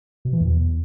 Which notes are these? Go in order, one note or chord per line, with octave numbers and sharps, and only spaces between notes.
B2
E3
E2